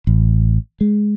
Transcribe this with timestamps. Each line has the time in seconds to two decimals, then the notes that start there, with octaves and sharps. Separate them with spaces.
0.07 A1
0.81 G#3